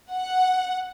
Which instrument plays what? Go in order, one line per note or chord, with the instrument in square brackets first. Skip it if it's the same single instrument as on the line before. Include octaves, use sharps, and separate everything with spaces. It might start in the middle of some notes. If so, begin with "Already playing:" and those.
[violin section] F#5